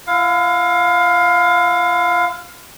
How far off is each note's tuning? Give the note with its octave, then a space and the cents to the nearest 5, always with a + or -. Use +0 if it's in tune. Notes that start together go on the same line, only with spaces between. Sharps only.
E4 +45 F5 +25